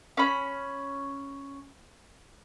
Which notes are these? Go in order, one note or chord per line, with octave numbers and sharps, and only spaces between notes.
C#4 B5